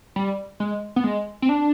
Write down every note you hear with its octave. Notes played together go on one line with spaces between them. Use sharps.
G3
G#3
B3
G#3
C4
D4